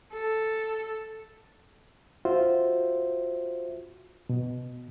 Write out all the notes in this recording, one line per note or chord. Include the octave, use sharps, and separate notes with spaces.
A4
F4 F#4 C5 E5
B2